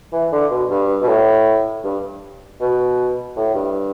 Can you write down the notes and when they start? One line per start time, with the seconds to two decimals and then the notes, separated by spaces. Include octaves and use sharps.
0.12 E3
0.32 D3
0.51 B2
0.70 G2
1.02 B2
1.08 A2
1.84 G2
2.61 B2
3.36 A2
3.55 G2